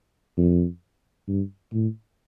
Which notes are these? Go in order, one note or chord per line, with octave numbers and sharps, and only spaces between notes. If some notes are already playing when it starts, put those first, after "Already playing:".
F2
G2
A2